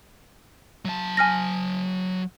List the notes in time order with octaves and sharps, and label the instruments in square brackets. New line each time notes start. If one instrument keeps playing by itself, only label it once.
[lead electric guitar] F#3 A5
[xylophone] G#5 F6 A#6